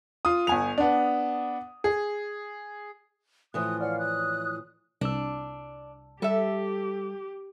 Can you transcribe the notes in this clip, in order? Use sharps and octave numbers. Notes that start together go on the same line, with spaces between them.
F4 D#6
G1 G#5 F7
B3 D4
G#4
A2 E3 F3 D#6 F#6
C#5 D5 F5 F#5 F6
D#6 F#6
C2 D4 E6
G3 G4 A4 E5